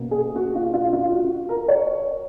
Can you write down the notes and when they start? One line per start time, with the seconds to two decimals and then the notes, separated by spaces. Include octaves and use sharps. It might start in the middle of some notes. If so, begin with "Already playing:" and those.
Already playing: B2 A#3 C#4
0.11 G#4
0.36 F#4
0.55 F4
0.74 F4
0.93 F4
1.12 F#4
1.49 A#4
1.68 C#5